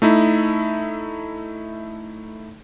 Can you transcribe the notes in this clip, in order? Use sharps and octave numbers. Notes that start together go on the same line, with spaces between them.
A3 D#4 E4